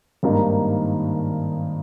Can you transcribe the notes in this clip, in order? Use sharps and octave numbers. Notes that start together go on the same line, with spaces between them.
G#1 G2 D#3 A#3 D#4